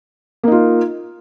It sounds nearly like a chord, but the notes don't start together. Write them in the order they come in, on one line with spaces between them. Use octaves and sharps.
A#3 D#4 F4